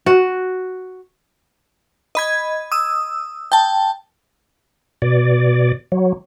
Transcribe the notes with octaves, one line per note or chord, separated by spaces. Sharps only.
F#4
D#5 B5 G#6
D#6 E6
G5 A5
B2 D5
F#3